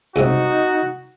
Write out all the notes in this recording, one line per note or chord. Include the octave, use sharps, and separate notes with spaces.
C#2 G2 C3 D#4 F#4